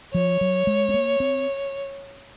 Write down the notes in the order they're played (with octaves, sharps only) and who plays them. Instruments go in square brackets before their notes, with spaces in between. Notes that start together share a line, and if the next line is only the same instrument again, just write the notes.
[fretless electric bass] F3 [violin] C#5
[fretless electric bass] F#3
G#3
C4
A#3
C4